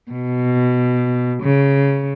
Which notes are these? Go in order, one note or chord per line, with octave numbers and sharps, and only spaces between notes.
B2
C#3